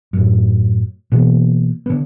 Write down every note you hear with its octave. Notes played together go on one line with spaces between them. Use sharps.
F#2 A2
B2 E3 A#3
D3 B3